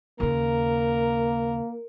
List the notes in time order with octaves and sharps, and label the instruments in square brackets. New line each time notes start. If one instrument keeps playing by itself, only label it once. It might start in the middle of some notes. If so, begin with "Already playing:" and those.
[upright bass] D#2 C#3 [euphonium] A#3 [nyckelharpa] A#4